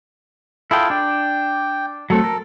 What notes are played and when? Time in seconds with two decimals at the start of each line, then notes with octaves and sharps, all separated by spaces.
0.71 E4 F4 G#4 A4 G5
0.90 D4 D5 G5
2.10 F#3 A3 C4 A4
2.24 A#4